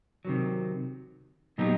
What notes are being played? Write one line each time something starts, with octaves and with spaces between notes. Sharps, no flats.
C3 D#3 F#3
A#2 F#3 B3 D#4 G4